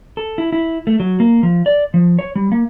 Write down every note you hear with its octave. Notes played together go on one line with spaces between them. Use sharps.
A4
E4
E4
A3
F#3
A#3
F3
D5
F3
C#5
G3
A#3